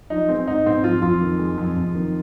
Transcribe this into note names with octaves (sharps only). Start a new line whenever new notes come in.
F3 D#4
G#3 C4
G#2 D#4
G#2 C4
F3 F4
F2 F4
D#3
G#3
F2
F2
D#3